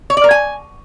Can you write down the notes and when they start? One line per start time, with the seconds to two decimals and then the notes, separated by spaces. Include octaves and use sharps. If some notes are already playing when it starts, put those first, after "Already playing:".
0.10 C#5
0.17 D5
0.24 A#4
0.31 G#5